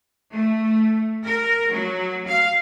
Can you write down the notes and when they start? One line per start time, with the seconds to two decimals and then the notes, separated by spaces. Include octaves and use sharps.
0.33 A3
1.24 A#4
1.70 F#3
2.27 F5